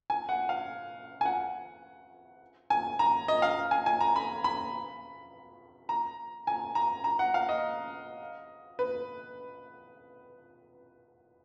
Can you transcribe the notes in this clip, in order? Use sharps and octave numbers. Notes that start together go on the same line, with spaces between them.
G#5
F#5
F5
G#5
F#5
G#5
A#5
D#5
F5
G#5
G#5
A#5
B5
B5
A#5
G#5
A#5
A#5
F#5
F5
D#5
B4